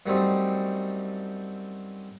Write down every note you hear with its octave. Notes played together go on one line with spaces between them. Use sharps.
F#2 G3 A3 C4 D#4